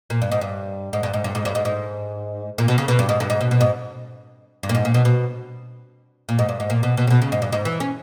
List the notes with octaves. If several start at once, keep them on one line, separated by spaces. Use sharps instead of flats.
A#2
G2
G#2
G2
G#2
G2
G#2
G2
G#2
G2
G#2
G#2
A#2
B2
C#3
B2
G2
G#2
G2
G#2
B2
B2
G#2
G2
A#2
G#2
A#2
B2
B2
A#2
G#2
G2
G#2
A#2
B2
B2
C#3
B2
C#3
G#2
G2
G#2
E3
C#4